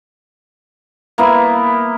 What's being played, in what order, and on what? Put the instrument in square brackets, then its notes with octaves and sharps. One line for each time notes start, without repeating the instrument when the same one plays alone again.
[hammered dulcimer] A#3 B3 E4